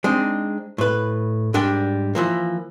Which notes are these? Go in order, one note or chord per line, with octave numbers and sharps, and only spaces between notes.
G#3 C4 D4 D#4
A2 B4
G#2 G3 D4 A#4 G5
E3 F3 A#3